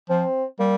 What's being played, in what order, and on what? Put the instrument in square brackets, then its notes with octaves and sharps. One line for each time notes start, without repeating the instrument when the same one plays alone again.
[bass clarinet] F3 [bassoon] C4
[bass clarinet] G3 [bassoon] A#3